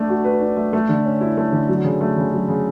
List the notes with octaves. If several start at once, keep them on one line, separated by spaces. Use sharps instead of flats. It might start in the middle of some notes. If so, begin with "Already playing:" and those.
Already playing: A3 D4
F#4
B4
D4
A3
A3
D3
C#4
E4
A3
D3
F#3
C#3
A3
C#3
F#3
C#3